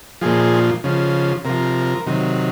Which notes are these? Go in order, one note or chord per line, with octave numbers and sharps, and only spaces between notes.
A#2 F3 G#4
C#3 F3
C3 F3 A#4
C3 D#3 F#3